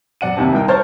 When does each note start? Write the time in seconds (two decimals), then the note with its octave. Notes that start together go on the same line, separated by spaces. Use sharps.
0.21 F#2 D5 F#5 D#7
0.36 D#2 C3 C4 A5
0.53 C2 D#4 A#4 G5
0.68 C5 C#5 A5 F6 G6 A6